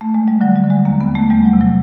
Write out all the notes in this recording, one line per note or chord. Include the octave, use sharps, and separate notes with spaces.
A3
G#3
G3
D3 F#3
G3
D3
G#3
D#2 A#3
B3
D#2
A3
E2 G3
F#3
C3
F#3